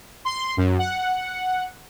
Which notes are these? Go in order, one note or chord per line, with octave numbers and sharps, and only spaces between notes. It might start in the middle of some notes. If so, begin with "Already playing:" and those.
C6
F#2
F#5